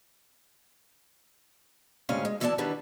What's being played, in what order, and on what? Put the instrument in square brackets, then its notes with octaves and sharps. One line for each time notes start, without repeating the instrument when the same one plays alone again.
[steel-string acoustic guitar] D2 G#2 C#3 C#4 G4 F5
G#3
D2 E3 B3 E4 D5 A5
D#3 G3 B3 D4 E4